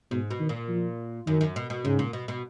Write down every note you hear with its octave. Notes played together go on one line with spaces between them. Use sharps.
G#2 B2
B2
D#3
A#2
F3
F#2 D#3
F#2
B2
B2
G#2 C#3
A#2
B2
B2